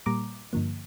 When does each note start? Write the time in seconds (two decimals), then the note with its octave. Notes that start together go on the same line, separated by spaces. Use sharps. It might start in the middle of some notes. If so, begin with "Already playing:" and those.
0.06 A#2 G3 A#3 A#5 D6
0.53 G2 D3 F3 A#3